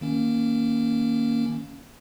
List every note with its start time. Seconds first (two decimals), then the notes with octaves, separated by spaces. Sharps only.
0.01 D#3 A#3 C#4